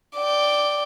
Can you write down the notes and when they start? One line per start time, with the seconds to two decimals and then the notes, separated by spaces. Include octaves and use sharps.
0.17 D5 G5